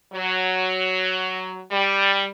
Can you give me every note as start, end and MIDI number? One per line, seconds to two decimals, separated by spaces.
0.13 1.62 54
1.71 2.27 55